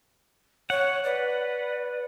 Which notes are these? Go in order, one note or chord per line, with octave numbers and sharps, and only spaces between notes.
C#5 F#5
B4 D5